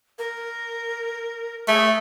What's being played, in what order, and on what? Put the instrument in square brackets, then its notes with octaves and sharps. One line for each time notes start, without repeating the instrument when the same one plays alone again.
[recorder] A#4
[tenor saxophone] A3 [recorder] G#4